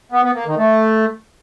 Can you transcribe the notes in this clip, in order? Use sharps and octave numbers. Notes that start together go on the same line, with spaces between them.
B3
B3
A#3
D#3
A3